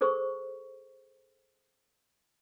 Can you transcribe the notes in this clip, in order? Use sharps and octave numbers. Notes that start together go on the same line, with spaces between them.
G#4 A4 C5 C#6